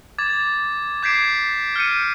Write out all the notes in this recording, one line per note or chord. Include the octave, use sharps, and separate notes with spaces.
D6 G#6 A6
D6 G6 G#6 B6 C7 D7
F6 G6 C#7 D#7